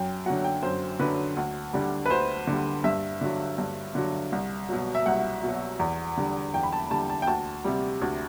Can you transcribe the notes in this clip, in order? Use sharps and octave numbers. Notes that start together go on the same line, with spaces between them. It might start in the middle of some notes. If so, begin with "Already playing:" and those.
Already playing: F#2 G5
D3 F#3 F#5
G5
F#2 C5
D3 F#3 B4
D2
D3 G3
B4
D2 C5
D3 G3
G2 E5
D3 F#3
G2
D3 F#3
C2
B2 F#3
E5
C2 F#5
B2 F#3
E2
D3 G3
E2 G5
B5
A5
D3 G3 A5
A5
G5
D2 A5
C3 G3
D2